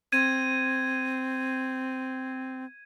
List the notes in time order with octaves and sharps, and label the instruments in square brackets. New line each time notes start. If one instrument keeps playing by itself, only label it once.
[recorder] C4 [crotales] G#6 D#7